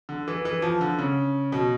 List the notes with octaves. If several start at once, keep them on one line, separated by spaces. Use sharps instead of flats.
D3
E3
E3
F3
D3
C#3
B2